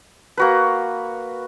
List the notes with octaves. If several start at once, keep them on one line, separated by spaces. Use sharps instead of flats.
A#3 F#4 B4